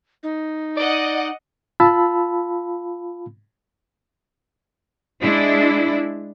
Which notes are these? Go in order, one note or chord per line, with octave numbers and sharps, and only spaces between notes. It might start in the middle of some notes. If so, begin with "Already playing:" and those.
D#4
D5 D#5 F#5
F4 F5 A5 B5 E6
G#3 D4 E4